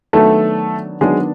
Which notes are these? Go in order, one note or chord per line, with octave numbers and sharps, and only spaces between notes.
D#3 F#3 A3 B3 D4 A4
D#3 F#3 G#3 B3 D4 G#4